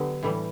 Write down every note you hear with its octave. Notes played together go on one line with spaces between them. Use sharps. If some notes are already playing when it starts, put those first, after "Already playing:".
Already playing: D3 F#3 B3 G4
A2 E3 G3